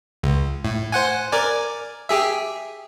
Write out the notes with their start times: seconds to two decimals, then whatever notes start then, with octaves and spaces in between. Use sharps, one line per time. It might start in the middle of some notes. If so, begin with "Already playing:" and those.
0.23 C#2
0.65 A2
0.92 C5 F#5 G#5
1.32 A#4 D5 G#5
2.09 G4 G#4 E5